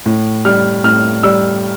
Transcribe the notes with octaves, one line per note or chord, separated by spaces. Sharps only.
A2
G3 F6
A2 F6
G3 E6